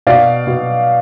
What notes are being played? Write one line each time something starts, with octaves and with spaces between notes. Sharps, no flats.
B2 D5 F5
B2